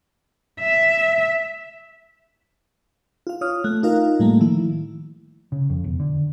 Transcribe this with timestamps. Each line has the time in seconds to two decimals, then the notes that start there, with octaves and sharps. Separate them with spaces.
0.60 E5
3.27 F4 F5
3.41 F4 C#5 D#6 F6
3.64 A3 F#6
3.83 D#4 F4 A#4 F5
4.19 A2 G3 A3 A#3
4.41 D#3 F3 E4
5.52 C#3
5.70 F2
5.84 E1
6.00 D3